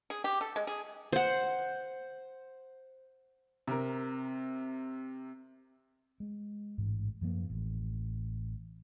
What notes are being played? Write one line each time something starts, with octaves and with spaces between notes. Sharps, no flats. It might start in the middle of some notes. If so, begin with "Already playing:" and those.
G#4
G4
A4
G#3
G#4
C5 F#5
C3 A#4
G#3
A1 G#2
F#2 F3 A#3
A1